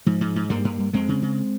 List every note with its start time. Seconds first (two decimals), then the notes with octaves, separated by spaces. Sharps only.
0.06 G#2 F3
0.21 G#2
0.36 G#2
0.50 G2 G3 A#3
0.65 G2
0.79 G2
0.93 F2 G#3 C4
1.08 C#3
1.22 C#3